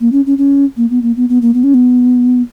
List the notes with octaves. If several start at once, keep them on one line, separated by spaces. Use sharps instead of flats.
A#3
C#4
C#4
C#4
A#3
B3
A#3
B3
B3
A#3
B3
C#4
B3